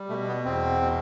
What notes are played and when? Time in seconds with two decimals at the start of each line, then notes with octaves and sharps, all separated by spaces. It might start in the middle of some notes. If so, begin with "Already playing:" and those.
Already playing: G3
0.09 B2 A3
0.27 B3
0.45 E2 C4
0.81 B2